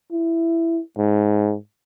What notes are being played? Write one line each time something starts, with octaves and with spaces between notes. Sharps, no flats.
E4
G#2